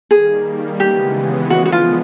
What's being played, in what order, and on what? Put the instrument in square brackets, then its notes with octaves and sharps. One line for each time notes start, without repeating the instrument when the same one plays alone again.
[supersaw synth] D#3 G3 A#3 [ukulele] G#4
[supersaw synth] C#3 E3 G#3 B3 [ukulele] G4
[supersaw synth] D3 F3 G#3 B3 [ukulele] F#4
[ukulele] F#4
F4